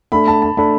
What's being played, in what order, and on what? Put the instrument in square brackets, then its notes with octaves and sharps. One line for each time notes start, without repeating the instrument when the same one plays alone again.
[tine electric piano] A3 D4 A4 [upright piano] B5
[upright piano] A5
A5
[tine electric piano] A3 D4 A4 [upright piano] B5